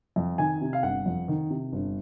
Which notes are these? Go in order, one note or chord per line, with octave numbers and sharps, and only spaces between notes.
F2
D#3 G#5
C3
F5
G1 F#5
F2
D#3
C3
G1